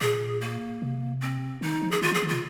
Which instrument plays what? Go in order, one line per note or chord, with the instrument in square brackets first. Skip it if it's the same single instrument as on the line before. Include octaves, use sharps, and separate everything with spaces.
[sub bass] A#2 [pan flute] G#4
[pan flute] A#3
[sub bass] C3
[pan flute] C4
[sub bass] D#3 [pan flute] D#4
[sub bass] F3
[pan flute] G#4
[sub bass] D#3 [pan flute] F4
[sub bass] F3
[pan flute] G#4
[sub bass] D#3
[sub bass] C3 [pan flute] F4